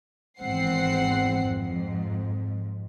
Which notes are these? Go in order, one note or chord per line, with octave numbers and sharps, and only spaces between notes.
G#1 E2 G#2 C4 F#5 C7
F2 G#2